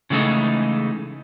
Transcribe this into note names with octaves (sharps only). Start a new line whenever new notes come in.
C#3 E3 G#3 A3 D#4